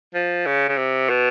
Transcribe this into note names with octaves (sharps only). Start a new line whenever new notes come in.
F3
C#3
C#3
C3
B2